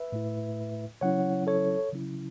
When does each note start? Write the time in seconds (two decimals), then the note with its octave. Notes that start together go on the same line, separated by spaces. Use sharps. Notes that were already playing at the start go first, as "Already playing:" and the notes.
Already playing: B4 E5
0.12 A2 A3 E4
1.01 C#3 F#3 C#4 E4 C#5 F#5
1.47 A4 C#5
1.93 C#3 F#3 C#4 E4